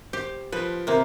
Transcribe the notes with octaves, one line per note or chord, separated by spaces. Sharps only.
G4 C5
F3 B4
C3 A#3 B4 C5